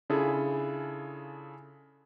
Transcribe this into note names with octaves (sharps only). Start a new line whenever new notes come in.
C#3 D4 E4 F4 G#4 A4